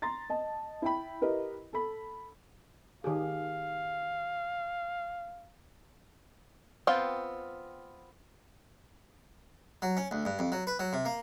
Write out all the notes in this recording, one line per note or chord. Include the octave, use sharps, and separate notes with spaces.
A#5 C6 A6
D#5 A5
E4 G5 B5
E4 G4 A#4 B4 D#5
A4 B5
D#3 G4 G#4 F5
B3 C4 F4 F5 G5
F#3
C#4
D2
G2
F2
F#3
B4
F#3
C3
A#3